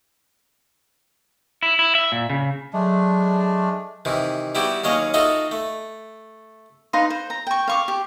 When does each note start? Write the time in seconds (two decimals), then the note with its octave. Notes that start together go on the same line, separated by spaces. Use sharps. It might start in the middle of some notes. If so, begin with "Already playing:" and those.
1.63 E4
1.79 E4
1.95 E5
2.12 A#2
2.30 C#3
2.73 F#3 G#3 A3 D4
4.05 C3 D#3 E3
4.55 G3 B3 E4 F#4 G4
4.84 D#2 F#3 C#4 D#5 F5
5.14 D#4 F4 F#4 A4 D#5 E5
5.51 A3
6.93 D#4 B4 F5 C6
7.10 C5
7.30 A#5
7.47 G5 C#6
7.68 F5 C#6 D6
7.88 G4